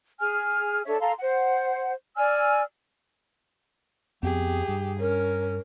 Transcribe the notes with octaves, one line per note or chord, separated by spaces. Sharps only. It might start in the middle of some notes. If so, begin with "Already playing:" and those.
G#4 G#5 F6
D4 A4 C#5 E5
A4 F5 A#5 C6
C5 F#5
D5 G#5 E6 F6
F2 B3 C4 G4 G#4
G2
C#4 A#4